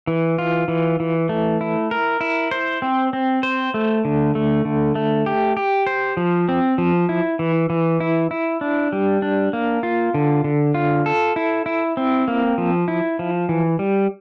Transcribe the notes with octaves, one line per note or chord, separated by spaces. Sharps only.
E3
F4
E3
E3
A3
E4
A#4
E4
C5
C4
C4
C5
A3
D3
A3
D3
A3
G4
G4
C5
F3
C4
F3
E4
E3
E3
E4
E4
D4
G3
D4
A#3
F4
D3
D3
F4
A4
E4
E4
C4
A#3
F3
E4
F3
E3
G3